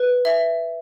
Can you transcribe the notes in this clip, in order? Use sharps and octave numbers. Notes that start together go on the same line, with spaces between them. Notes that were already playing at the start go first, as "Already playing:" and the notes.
Already playing: B4
E5